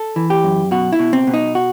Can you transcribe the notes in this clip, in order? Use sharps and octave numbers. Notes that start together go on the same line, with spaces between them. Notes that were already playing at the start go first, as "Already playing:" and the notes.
Already playing: A4
E3
G4
F#2
B2 F#4
E4
B2
C4
B2
D#4
F#4